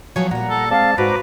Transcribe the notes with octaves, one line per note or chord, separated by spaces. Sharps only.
F3 F#3 B3 C#5 G#5 C#6
A#2 G3 F#5 A#5
A4
G#3 C4 D5 F5 A5
G#2 F#4 B4 C5 A#5 D6